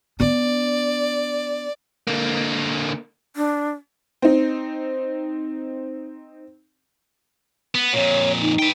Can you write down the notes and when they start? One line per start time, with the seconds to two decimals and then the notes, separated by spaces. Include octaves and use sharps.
0.20 B3 D4 D5
2.07 D3 A#3
3.36 D4
4.22 C4 D#4
7.75 B3
7.93 F2 A#2 C#5
8.42 D#4
8.59 B4 G5